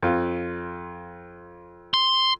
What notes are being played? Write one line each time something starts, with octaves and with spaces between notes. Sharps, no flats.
F2 F4
C6